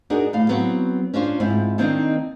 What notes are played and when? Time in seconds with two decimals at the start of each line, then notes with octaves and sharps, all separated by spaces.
0.10 D4 D#4 F#4 G#4 A#4
0.33 A2 F5
0.49 F#3 B3 C4
1.14 C#4 D4 F4 C5
1.40 G#2 C4 E4 F4
1.78 D#3 A#3 C4 D4 D#4 D#5